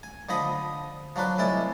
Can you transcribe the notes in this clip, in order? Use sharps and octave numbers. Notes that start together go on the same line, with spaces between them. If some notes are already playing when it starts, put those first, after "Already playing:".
G#5
D3 F3 D#5 B5 D#6
F3 F#3 D4 B4
C2 G#3 E4 D5